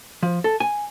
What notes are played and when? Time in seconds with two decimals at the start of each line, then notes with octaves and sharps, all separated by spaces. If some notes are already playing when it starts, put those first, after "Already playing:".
0.23 F3
0.44 A4
0.60 G#5